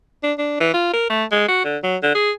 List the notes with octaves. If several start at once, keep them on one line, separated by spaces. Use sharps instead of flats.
D4
D4
E3
F4
A#4
A3
G#3
F#4
D3
F#3
D3
G#4